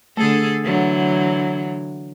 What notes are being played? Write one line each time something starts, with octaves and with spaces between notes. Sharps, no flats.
D3 A3 G#4 A4
D3 E3 F#3